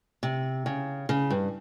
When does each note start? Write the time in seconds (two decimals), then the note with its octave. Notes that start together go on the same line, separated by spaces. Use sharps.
0.23 C3
0.66 C#3
1.09 C#3
1.31 G2